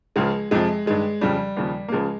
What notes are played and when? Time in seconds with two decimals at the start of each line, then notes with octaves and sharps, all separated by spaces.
0.16 C#2 C#3 F3 G#3
0.51 F2 C3 F3 G#3
0.86 G2 D#3 G#3
1.21 F2 C#3 F3 G3
1.57 D#2 C#3 F3
1.88 A#3
1.92 C#2 C#3 F3 G#3